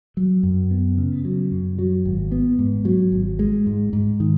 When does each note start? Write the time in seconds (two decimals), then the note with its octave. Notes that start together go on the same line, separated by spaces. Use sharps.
0.17 F#3
0.43 F#2
0.71 B3
0.98 C#3
1.25 F#3
1.52 F#2
1.79 F#3
2.05 G#1
2.32 B3
2.59 G#2
2.85 F#3
3.12 G#1
3.39 G#3
3.66 G#2
3.93 G#2
4.20 D#3